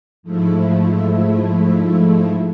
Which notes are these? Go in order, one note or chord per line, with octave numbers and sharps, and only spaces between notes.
G#2 F3 A3 E4